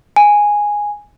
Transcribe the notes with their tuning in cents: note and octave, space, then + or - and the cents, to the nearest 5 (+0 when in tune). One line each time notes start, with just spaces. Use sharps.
G#5 -5